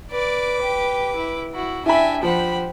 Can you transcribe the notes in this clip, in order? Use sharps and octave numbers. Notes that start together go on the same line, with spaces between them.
B4 D5 D6
G4
E4
E4 F#4
D4 E4 G4 E5 G#5 B5
F3 G4 C5 F#5 B5